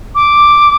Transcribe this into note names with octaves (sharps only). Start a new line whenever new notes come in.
D6